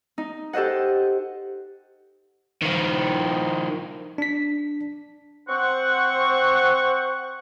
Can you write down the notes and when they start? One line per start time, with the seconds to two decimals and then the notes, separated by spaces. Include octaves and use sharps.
0.18 D#4
0.53 G4 A4 C5 D#5 F#5
2.62 D#3 F3
4.18 D4 B6
5.48 C4 C5 F#5 C#6